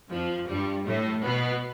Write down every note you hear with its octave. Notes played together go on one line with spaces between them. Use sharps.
F2 F3
G2 G3
A2 A3
B2 B3